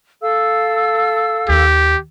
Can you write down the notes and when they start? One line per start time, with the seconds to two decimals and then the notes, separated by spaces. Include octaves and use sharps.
0.22 A4 F5 E6
1.49 D#2 D#3 G4